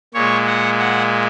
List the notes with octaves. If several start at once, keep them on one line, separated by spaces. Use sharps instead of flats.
A#2 G#3 C#5
F#5
F#5